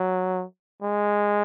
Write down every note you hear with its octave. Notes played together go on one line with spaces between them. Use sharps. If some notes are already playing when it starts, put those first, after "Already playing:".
Already playing: F#3
G#3